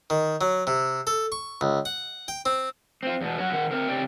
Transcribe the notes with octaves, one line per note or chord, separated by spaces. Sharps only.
D#3
F#3
C3
A4
C#6
C#2
F#5
G5
C4
C4 F4
E2 B2
F#3 C#4 F#4
D#3 F#5
C4 A#4
C#3 C4 G4 D5 G5